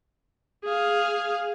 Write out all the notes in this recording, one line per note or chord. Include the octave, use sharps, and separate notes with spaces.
G#4 F5